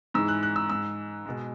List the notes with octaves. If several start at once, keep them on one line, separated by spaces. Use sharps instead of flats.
G#2 E3 G#3 E6
F#6
F#6
E6
G#2 G#3 E6
B2 G#3